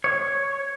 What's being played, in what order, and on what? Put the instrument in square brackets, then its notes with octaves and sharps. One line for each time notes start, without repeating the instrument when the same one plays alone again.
[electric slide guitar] C#5